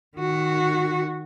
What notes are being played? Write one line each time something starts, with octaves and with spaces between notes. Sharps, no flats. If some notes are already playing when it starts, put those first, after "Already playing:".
D#3 F#4